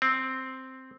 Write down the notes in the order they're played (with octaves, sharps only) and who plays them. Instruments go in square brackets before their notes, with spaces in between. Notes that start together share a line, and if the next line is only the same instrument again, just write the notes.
[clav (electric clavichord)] C4